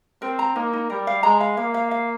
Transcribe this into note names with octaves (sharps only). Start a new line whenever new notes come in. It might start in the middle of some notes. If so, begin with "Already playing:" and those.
C4 A#4
A#5
A#3 D#4
D#4
G3 A#4
F5
G#3 A#5
F5
A#3 F5
F5
F5